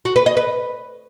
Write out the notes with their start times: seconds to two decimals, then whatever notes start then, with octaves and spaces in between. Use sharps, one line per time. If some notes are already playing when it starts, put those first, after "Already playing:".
0.05 F#4
0.16 B4
0.26 D#5
0.37 B4